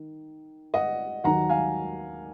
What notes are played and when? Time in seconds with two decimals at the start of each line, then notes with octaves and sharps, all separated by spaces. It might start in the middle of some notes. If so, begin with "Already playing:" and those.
Already playing: D#3
0.74 D#5 F#5
1.24 D#2 D#3 F#3 F#5 A#5
1.49 F5 G#5